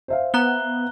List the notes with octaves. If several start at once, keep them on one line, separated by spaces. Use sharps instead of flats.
C5 E5 F5
B3 A#5 F#6 G7